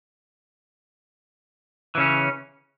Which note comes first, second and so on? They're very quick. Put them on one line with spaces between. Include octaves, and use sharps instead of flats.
E3 C#3 C#4